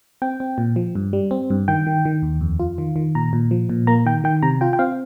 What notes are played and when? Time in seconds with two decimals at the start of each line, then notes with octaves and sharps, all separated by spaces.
0.22 C4 G5
0.40 C4
0.58 A#2
0.76 F3
0.95 G2
1.13 G3
1.31 C4
1.50 G2
1.68 D#3 G5
1.86 D#3
2.05 D#3
2.23 D#2
2.41 F2
2.60 F4
2.78 D#3
2.96 D#3
3.15 A#2 A#5
3.33 A#2
3.51 F3
3.69 A#2
3.87 A#3 A#5
4.06 D#3 G5
4.24 D#3 G5
4.43 C3 A#5
4.61 F4 G5
4.73 G5
4.79 C4 F5